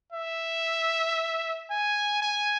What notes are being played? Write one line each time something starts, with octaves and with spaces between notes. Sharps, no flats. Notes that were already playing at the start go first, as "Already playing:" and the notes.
E5
G#5
G#5